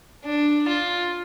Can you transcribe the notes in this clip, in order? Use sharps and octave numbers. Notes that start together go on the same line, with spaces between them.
D4
F4